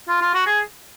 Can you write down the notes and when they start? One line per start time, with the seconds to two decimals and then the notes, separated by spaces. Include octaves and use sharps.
0.08 F4
0.21 F4
0.34 F#4
0.46 G#4